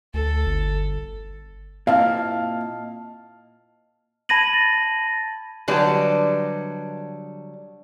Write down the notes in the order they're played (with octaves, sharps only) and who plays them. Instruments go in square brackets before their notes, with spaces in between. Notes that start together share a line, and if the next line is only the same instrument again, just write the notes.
[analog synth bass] D2 [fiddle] A4
[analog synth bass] G1
[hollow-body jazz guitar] A#2 C4 E4 [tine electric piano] D#5 A5 F6 [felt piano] F5
[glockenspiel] A5 B5 G#6 A#6 D#7 F#7
A6
[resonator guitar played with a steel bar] D3 F#3 G3 [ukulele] B4 D#5 A5